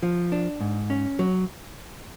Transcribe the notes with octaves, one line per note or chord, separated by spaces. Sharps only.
F3
D4
G#2
C#4
F#3